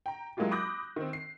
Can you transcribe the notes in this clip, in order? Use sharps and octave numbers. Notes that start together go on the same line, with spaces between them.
G5 A#5
F#3 G#3 A#3 E4 F4 G4
B5 D6 D#6 F#6 G6 A#6
D#3 C4
C7